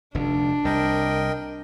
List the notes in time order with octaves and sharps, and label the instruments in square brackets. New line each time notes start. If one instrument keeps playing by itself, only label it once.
[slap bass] F1 D2 [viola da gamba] D4
[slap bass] C2 [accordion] A#4 D#5 G5